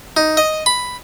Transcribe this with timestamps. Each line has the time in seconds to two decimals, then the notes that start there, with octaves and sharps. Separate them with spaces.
0.17 D#4
0.37 D#5
0.66 B5